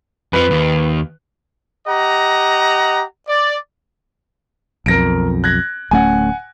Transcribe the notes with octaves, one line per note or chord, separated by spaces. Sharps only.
F2 F3 B4
D#2
G4 D#5 F#5 A#5
D5
B1 F2 A#4 A#6 D7
F#6 G#6 A#6
D1 A3 C#4 F#5 G#5